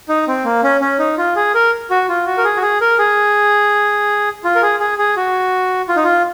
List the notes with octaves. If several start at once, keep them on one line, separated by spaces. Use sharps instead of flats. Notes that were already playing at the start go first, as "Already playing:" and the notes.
D#4
C4
A#3
C#4
C#4
D#4
F4
G#4
A#4
F#4
F4
F#4
A#4
G#4
F#4
G#4
A#4
G#4
F4
A#4
G#4
G#4
G#4
F#4
F4
D#4
F4